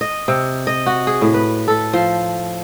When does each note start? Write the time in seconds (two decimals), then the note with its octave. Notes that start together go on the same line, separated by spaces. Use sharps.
0.01 D#5
0.28 C3
0.67 D#5
0.86 F#4
1.07 G#4
1.21 A2
1.34 B4
1.68 A4
1.93 F3